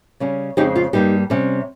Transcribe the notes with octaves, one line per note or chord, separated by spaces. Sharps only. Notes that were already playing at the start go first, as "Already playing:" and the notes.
C#3 G3 C#4
F2 C#3 G#3 C4 D#4 G4
F4
G2 G3 A#3 D#4 G4
C3 G3 C#4